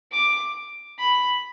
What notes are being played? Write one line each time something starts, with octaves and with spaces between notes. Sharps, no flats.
D6
B5